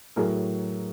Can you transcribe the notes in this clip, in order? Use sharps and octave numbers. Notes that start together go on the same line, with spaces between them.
A2 F#3 G#4 A#4